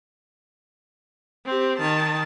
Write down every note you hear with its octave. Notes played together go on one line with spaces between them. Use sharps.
C4 G4
D#3 A5